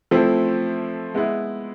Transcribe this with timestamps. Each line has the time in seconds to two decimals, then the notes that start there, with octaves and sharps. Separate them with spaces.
0.11 F3 A3 C4 E4
1.14 G#3 B3 E4